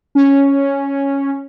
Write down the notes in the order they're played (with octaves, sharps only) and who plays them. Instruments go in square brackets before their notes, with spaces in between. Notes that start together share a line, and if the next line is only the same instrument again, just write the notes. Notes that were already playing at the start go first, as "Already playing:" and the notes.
[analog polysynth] C#4